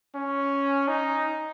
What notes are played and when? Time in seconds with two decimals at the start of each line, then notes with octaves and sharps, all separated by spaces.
0.15 C#4
0.88 D#4